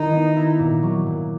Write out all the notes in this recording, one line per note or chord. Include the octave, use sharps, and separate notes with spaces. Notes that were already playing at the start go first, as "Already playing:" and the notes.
Already playing: D#3 G3 D#4 E4
B3
E4
A#2
F#3
A#2